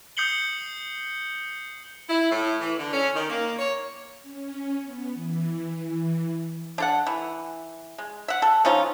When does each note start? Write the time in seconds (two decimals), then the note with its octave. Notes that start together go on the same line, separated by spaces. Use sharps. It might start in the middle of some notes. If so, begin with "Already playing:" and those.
0.17 D#6 G6 C7 C#7 F#7 G7
2.09 E4
2.31 A2
2.61 E3
2.79 D3
2.93 C#4
3.15 D#3
3.30 A#3
3.59 C#5
4.22 C#4
4.83 B3
5.14 E3
5.74 E3
6.78 D4 A4 F#5
7.07 E3
7.98 G#3
8.28 E5 F#5
8.42 A4
8.65 F3 C#4 D#4 F4